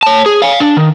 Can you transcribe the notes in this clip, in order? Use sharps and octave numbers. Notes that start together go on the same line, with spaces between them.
C#5 A5
G#4
F5 G#5
D4
D#3